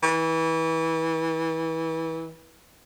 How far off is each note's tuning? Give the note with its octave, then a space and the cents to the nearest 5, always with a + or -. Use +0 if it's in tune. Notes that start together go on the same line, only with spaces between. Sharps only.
E3 -25